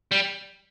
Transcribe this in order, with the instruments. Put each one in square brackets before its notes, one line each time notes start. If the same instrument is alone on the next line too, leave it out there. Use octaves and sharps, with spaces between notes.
[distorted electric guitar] G3